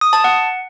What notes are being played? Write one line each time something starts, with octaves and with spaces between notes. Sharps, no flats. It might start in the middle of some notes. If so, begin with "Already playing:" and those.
D#6
A5
F#5